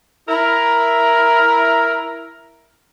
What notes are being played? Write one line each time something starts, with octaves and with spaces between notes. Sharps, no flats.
E4 A#4